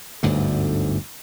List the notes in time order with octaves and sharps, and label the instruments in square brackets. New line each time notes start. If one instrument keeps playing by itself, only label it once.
[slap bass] G1 D2 G#2 D3